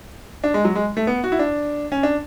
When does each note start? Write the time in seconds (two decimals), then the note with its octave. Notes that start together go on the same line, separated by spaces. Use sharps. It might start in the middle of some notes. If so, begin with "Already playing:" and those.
0.44 D4
0.54 G#3
0.65 F#3
0.75 G#3
0.97 A3
1.07 B3
1.24 F#4
1.32 E4
1.39 D4
1.92 C#4
2.03 D4